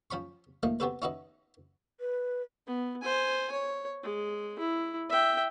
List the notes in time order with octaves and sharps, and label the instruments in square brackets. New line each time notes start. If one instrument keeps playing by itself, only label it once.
[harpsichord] F3 C#4 B5 C#6
F3 A3 A#3 D#4
B3 C4 F#4 G4 A4 B4
C#4 D#4 E4 F#4 B4 D#5
[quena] B4
[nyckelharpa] B3
C5 G#5
C#5
G#3
E4
E5 G5